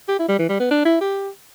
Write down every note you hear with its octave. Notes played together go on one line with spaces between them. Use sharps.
G4
E4
G3
E3
G3
B3
D4
E4
G4